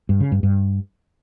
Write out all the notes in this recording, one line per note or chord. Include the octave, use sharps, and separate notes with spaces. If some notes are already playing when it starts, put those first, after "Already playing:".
G2
C#3
G2
G2